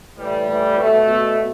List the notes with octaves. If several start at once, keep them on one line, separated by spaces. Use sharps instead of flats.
A2 E3 G3
A2 E3
B2 A3
B2